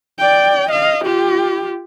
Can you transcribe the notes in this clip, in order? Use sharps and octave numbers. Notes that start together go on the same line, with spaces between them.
D5 G5
D#5 F5
F4 G4